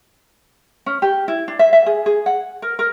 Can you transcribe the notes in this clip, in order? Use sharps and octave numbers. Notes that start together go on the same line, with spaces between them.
C#4
G4
E4
D4
E5
E5
G#4
G#4
F#5
A#4
A#4